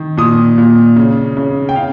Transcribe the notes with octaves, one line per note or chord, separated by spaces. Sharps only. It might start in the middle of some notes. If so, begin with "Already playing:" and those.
Already playing: D#3
A#2 D#6
A#2
C#3
C#3
G5
C#3 F5